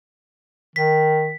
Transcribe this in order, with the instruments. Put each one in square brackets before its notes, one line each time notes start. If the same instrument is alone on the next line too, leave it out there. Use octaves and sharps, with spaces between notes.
[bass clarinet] D#3 [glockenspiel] B6